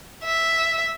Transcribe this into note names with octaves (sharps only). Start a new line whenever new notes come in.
E5